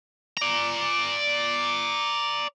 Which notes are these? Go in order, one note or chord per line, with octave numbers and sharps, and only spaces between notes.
D5 A#5